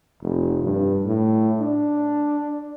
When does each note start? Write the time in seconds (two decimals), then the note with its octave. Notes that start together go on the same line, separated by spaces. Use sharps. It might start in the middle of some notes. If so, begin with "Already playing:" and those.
0.23 F1
0.63 G2
1.05 A2
1.61 D4